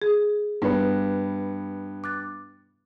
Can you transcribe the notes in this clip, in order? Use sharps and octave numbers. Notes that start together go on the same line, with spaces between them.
G#4
G2 B3
D6 F#6 A6